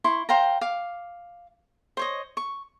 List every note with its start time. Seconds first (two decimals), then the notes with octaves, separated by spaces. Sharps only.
0.04 E4 C6 C#6
0.29 C5 F5 G5 A#5
0.61 F5 D6
1.97 C5 C#5 D#5
2.37 C#6